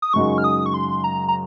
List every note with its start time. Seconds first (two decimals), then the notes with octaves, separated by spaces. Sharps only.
0.02 D#6
0.13 F#2 C#3 G#3 D#4 F#4 C#6
0.38 F6
0.44 D#6
0.66 C#6
0.74 C6
1.04 A#5
1.28 A#5